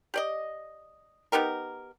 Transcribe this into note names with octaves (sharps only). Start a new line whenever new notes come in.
G4 D5 D#5
B3 D#4 G4 A#4